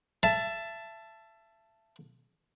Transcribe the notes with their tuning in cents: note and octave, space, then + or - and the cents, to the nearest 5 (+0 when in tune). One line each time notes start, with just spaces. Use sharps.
E5 +30 A5 +0